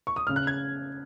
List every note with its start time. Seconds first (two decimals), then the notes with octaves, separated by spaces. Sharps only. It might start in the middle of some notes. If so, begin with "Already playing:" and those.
0.07 C#6
0.16 D#6
0.27 C#3 F6
0.36 F#6
0.47 G#6